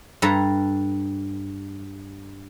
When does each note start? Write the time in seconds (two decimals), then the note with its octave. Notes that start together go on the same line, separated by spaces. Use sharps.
0.22 G2 A4 A#5